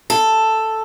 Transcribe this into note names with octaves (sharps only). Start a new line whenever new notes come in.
A4